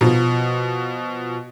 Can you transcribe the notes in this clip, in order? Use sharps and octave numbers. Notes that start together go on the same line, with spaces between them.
B2 F3